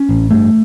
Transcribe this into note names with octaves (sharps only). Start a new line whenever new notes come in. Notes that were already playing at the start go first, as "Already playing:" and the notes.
Already playing: C#4
A1
G2 A3